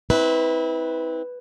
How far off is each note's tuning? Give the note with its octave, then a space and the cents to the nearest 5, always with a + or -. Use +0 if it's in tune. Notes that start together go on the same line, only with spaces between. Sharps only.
C4 +10 E4 -30 B4 +0